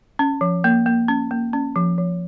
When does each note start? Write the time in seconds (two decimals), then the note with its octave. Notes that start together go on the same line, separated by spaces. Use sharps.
0.19 C#4
0.41 F3
0.64 A#3
0.86 A#3
1.08 C#4
1.31 A#3
1.53 C#4
1.76 F3
1.98 F3